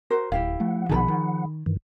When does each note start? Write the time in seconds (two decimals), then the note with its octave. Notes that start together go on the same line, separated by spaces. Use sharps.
0.10 F#4 A#4 C5
0.32 D1 E4 G4 F5
0.60 F3 A3 F#5
0.89 A#1 B2 D#3 G#4 A4 B5
1.08 D#3
1.66 G2 D#3 E3